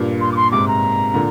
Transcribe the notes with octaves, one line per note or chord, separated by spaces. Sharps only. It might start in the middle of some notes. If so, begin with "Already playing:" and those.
Already playing: G2 A#2
C6
D6
C6
G#2 C3 D6
A#5
A#2 D3